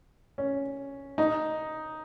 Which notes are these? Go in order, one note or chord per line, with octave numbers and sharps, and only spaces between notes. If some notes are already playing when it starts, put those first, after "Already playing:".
C#4
D#4